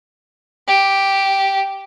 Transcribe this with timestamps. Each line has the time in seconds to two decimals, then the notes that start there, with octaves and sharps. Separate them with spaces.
0.68 G4